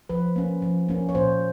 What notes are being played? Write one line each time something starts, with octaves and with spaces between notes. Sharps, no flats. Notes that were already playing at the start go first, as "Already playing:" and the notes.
F3 B4
A#3 C#4
F3
A#3 C#4
C#5
A#2 C5